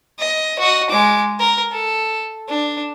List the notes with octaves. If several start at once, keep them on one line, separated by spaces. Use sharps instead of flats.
D#5
F#4 D#5
G#3 D6
A#4
A4
D4